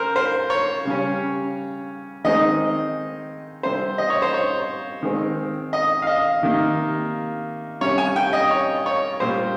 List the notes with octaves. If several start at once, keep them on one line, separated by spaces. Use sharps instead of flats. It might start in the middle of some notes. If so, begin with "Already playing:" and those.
Already playing: C#4 A#4 C5
C5
C#5
C#3 G3 C#4
D#3 G#3 C4 D#4 D#5
C3 G3 C4 C5
D#5
C#5
C5
C#5
D#3 G#3 C4
D#5
F5
D#5
C3 D#3 A#3
C3 G3 C#4 C#5
G#5
G5
D#5
C#5
C#5
A#2 G3 A#3 C5